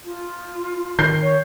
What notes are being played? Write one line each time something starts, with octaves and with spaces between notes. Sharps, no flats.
F4
D#3 G6 C7
C#5